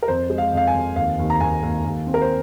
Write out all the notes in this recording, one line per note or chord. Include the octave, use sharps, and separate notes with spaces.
A#4
F2 C5
G#3
F5
F2 F5
G#5
F2
D#2 F5
D#2
A#5
D#2 G#5
D#2
D#2
C4
A#4
C5